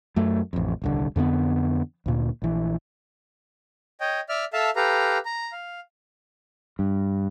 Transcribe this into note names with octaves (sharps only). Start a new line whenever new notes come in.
F#2 A3
A1 F2
D#1 C2 D3
F2 D3 A3 B3
D2 A#2
A#1 E3
C#5 D#5 G5
D5 E5 F6
A4 E5 F5 A5
G4 A4 B4 F5 A#5
A#5
F5
G2